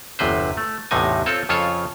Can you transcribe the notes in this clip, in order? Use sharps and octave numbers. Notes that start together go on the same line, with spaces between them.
G1 E2 C3 B4 C5
A3
A1 E2 A2 C3 D#4 G#5
C4 F4 A4 C#5
F2 C#3 F4 A4 C#5